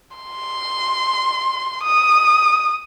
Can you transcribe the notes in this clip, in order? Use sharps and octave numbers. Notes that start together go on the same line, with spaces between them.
C6
D#6